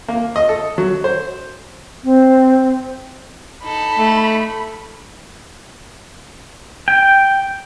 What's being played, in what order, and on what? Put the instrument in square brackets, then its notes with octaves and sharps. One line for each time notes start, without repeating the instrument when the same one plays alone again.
[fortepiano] A#3
D#5
A4
F#3
C5
[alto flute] C4
[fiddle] D#4 A4 [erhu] B5
[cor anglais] A3
[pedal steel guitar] G5